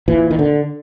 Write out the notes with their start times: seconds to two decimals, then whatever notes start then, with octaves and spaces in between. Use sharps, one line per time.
0.08 A#2 E3
0.31 D#3
0.39 D3